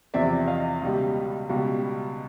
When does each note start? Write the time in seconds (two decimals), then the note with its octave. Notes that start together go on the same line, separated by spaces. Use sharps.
0.14 E2 C3 F3 D5 E5
0.48 D#5 F5
0.82 C#2 B2 G3
1.49 C#2 B2 G3